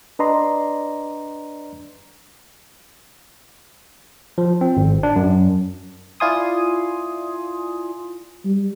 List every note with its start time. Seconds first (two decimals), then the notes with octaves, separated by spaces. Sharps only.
0.19 D4 B4 D5 D#5 A#5 C6
4.38 F3
4.61 C4
4.77 G#1
5.03 D4
5.16 F#2
6.20 E4 F4 D5 G#5 C6 D#6
8.45 G3